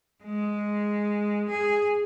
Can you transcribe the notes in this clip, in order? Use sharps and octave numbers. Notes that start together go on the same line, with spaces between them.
G#3
G#4